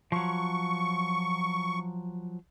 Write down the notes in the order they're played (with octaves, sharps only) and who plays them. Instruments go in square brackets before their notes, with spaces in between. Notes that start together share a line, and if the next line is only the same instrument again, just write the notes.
[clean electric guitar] F3 F#3 [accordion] C#6